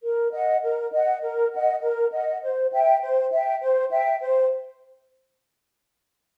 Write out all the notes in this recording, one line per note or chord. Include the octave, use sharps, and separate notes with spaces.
A#4
D#5 F#5
A#4
D#5 F#5
A#4
D#5 F#5
A#4
D#5 F#5
C5
E5 G5
C5
E5 G5
C5
E5 G5
C5